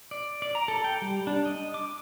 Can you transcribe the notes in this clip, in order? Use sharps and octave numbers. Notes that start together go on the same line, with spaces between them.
D5
D5
A#5
A4
G5
G3
D4
D#5
D6